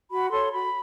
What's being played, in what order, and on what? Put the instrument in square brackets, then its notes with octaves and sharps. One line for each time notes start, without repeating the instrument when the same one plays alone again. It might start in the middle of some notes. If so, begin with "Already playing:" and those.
[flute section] F#4 B5
A4 C#5 C6
F#4 B5